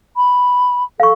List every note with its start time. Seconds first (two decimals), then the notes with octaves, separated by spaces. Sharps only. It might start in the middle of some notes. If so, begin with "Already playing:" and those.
0.16 B5
1.00 A4 F5 C#6